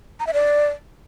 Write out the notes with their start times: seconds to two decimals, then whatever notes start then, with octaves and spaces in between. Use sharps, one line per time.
0.20 A#5
0.27 E5
0.34 D5